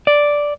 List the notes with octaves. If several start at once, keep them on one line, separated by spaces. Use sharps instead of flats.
D5